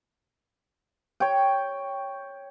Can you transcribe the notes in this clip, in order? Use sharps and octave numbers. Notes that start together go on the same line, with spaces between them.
C#5 G5